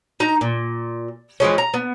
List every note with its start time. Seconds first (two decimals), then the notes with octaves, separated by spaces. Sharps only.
0.20 D#4 A#5
0.41 A#2
1.40 E3 F3 G#3 C#4
1.58 A#5
1.74 B3